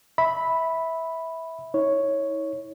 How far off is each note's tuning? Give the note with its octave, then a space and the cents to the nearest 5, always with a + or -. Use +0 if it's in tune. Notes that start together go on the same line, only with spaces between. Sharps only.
E5 -15 B5 +0
E4 -45 C#5 +0